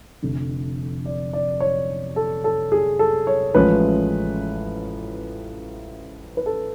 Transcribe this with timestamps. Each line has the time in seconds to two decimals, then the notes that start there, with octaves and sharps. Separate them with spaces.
0.22 F1 F2 D3
1.05 D5
1.33 D5
1.60 C#5
2.16 A4
2.44 A4
2.72 G#4
2.99 A4
3.27 C#5
3.55 A1 A2 F3 G#3 C#4 B4
6.37 B4
6.46 A4